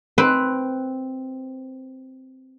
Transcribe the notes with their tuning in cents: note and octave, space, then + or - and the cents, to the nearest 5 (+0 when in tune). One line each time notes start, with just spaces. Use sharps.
C4 +0 B4 +5